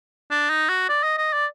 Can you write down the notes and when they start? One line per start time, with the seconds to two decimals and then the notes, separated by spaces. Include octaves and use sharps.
0.31 D4
0.50 D#4
0.69 F#4
0.89 D5
1.04 D#5
1.18 D#5
1.33 D5